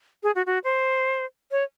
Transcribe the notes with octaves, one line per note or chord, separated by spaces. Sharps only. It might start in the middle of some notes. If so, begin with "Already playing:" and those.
G#4
F#4
F#4
C5
C#5